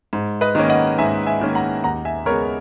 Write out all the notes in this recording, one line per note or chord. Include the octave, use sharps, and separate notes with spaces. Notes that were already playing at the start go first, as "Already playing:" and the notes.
G#2
B4 D#5
D#3 A#3 C#4
D#5 F#5
G#2 E5 G#5
E5 G#5
D#3 A#3 C#4
F#5 A#5
D#2 F#5 A#5
E5 G#5
C#3 G#3 B3 A#4 C#5